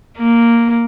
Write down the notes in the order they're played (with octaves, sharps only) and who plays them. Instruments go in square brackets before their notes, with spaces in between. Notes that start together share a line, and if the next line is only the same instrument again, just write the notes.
[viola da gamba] A#3